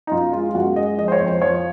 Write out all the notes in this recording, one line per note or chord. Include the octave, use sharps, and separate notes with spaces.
D#4
F#2 F4
G#3 F4
F4
F#2 F#4
G#3 D#5
F3 D#5
C5
C#5
F2
C5
F3 C#5